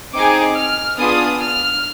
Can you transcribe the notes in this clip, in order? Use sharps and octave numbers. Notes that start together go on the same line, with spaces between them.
C4 D#4 G#4 D6
F6
B3 D4 F4 G#4 D#6
F6